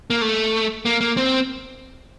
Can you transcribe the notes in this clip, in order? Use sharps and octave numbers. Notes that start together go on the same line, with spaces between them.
A#3
A3
A#3
A#3
C4